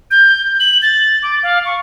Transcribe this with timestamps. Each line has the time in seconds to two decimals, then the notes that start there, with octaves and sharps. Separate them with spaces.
0.11 G6
0.60 F#7
0.82 A6
1.23 D6
1.43 F5
1.65 C#6